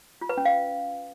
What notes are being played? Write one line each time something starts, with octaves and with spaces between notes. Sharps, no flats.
F4
B4
C#4
F5